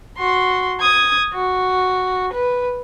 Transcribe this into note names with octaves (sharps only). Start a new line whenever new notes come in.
F#4 C6
D#6 G#6
F#4
B4